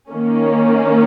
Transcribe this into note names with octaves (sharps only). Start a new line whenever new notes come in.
D#3 A#3 C#4